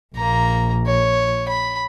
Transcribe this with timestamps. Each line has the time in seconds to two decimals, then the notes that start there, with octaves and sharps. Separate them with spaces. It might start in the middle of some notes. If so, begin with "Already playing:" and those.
0.16 A#1 A#3 A#5
0.87 C#5
1.48 B5